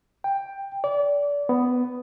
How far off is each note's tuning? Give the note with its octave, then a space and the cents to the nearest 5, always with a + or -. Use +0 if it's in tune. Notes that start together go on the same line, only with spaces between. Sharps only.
G5 +10
D5 -30
B3 +10